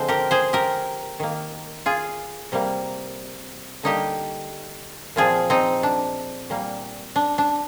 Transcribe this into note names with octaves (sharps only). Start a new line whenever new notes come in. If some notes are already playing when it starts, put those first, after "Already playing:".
Already playing: D3 F3 G#3 C4 C5
G4 A#4
G#4 C5
G4 A#4
D#3 A#3
F4 G#4
C3 G3 A#3
D3 G3 A#3 D#4 G4
A#2 F3 C4 F4 G#4
C4 D#4
D4
A#2 G3 A#3
D4
D4